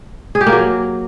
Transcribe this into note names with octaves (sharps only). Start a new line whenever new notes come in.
G#4
G4
A#3
F#3